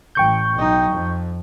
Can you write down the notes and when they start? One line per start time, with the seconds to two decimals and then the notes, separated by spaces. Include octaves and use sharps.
0.15 A1 G5 C#6 G6
0.54 B1 D#4
0.90 F2